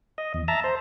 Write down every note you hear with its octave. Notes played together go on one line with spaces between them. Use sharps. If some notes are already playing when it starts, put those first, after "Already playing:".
D#5
E2
E5 A5 A#5
C5